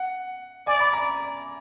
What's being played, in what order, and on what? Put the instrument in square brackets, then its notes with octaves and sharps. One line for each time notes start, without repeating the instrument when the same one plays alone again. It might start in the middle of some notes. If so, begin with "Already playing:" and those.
Already playing: [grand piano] F#5
[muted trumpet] D5 [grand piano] G#5
[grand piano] B5
A#5